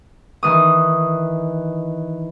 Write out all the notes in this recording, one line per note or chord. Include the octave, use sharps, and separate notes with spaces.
D#3 E3 D#6